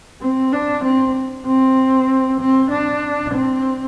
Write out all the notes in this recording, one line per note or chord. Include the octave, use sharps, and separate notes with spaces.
C4
D4
C4
C4
C4
D4
C4